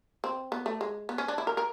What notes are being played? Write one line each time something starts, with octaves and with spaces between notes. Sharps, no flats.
C4
B3
A3
G#3
B3
C#4
D4
E4
A#4
A#4